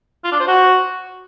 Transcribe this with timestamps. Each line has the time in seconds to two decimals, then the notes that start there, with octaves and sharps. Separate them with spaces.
0.24 F4
0.32 D4
0.40 C5
0.47 F#4